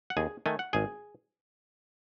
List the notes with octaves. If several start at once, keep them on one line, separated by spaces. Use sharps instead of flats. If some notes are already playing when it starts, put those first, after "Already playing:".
F#5
D#2 G#4 G#5
D#3 A3 G#5
F#5
G#1 G#4 G#5